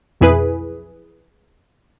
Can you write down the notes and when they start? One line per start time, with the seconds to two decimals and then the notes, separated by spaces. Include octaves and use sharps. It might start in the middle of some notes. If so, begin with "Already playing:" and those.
0.21 B1 F2 E4 G#4 B4